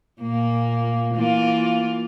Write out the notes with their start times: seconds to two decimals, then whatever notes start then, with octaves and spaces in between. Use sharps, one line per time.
0.21 A#2 A#3
1.16 E3 A#3 F4